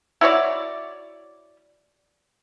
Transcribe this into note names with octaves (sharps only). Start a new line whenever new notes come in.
E4 F#4 C#5 D5